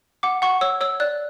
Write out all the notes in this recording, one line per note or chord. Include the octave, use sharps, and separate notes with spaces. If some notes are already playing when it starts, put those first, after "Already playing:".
F#5 D6
F#5 C#6
C#5 E6
C#5 E6
D5 F#6